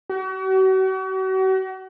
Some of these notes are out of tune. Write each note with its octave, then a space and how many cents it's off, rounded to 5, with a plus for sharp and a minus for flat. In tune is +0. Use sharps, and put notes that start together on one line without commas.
F#4 +40